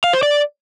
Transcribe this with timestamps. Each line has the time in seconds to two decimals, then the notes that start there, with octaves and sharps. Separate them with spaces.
0.04 F5
0.13 C5
0.23 D5